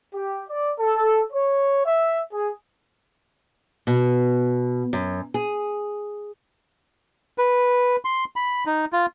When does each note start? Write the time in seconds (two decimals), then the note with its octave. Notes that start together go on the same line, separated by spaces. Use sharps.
0.14 G4
0.49 D5
0.80 A4
1.33 C#5
1.86 E5
2.33 G#4
3.87 B2
4.93 F#2
5.34 G#4
7.38 B4
8.05 C6
8.36 B5
8.66 D#4
8.93 F4